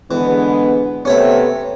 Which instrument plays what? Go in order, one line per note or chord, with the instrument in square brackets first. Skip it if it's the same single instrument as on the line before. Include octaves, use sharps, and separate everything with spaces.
[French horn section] D3 G#3 B3 [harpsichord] E3
[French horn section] C3 A3 B3 [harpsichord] C#4 C#5 E5